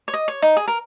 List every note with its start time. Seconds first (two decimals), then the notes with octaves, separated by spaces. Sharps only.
0.08 C#5
0.14 D#5
0.28 C#5
0.42 D#4
0.57 G#4
0.68 A#4